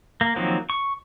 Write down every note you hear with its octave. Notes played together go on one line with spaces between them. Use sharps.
A#3
D#3 F3 F#3 A#3 C4
C#6